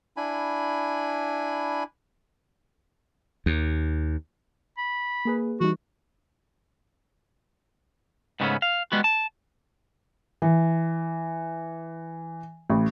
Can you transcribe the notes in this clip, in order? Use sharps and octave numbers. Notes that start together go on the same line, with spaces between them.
D4 E4 G#5 B5
D#2
B5
A#3 G#4 B4
E3 G3 D#4 F#4
G#2 C#3 G3 A3 B3 C#4
F5
G3 G#3 B3 F#4
A5
E3
A1